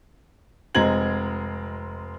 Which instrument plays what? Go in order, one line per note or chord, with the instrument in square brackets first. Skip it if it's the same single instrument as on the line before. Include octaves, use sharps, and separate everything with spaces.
[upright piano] F1 G#3 C4 A#5 G#6 F#7